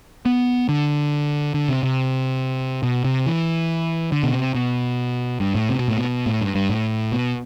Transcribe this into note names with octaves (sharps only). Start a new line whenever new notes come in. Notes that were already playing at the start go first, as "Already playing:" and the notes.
B3
D3
D3
C3
C3
B2
C3
E3
D3
B2
C3
B2
G2
A2
C3
B2
A2
B2
A2
G2
G2
A2
B2